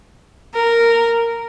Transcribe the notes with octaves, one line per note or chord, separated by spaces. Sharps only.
A#4